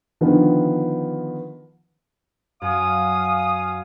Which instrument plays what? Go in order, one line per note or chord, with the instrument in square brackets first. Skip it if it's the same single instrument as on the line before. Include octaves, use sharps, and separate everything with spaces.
[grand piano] D3 D#3 F3 B3
[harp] F#2 [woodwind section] F5 G#5 D#6